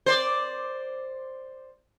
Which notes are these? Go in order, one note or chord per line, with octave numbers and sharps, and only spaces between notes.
C5 D5